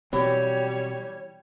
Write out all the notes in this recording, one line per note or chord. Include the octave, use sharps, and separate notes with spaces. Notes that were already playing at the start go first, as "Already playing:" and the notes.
B2 E3 F#3 G3 C4 G4 C#5